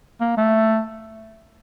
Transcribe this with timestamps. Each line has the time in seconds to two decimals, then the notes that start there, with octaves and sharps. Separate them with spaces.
0.20 A#3
0.37 A3